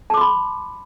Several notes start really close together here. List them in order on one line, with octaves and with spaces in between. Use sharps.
A5 D6 C6 B5